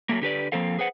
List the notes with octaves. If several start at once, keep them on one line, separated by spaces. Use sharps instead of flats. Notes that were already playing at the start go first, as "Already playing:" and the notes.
F#3 A3 A#3
D3 G4 B4 D5
F3 A#3 C4 A4 F5
G#4 B4 C5 F#5